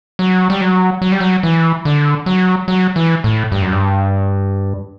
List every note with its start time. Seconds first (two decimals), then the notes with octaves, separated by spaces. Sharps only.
0.19 F#3
0.50 G3
0.61 F#3
1.02 F#3
1.12 G3
1.20 F#3
1.43 E3
1.85 D3
2.26 F#3
2.68 F#3
2.96 E3
3.24 A2
3.52 G2
3.62 F#2
3.72 G2